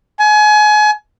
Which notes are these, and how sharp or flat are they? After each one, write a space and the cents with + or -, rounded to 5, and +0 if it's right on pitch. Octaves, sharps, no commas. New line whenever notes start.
G#5 +30